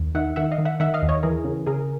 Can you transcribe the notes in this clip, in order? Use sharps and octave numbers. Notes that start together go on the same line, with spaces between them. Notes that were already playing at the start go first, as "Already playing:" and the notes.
Already playing: D#2
D#3 E5 F#5
D#3 E5 F#5
D#5 F5
D#3
E5 F#5
D#3 E5 F#5
D#5 F5
D#2
C#5 D#5
E3 G#4 A#4
C#3
C#3 G#4 A#4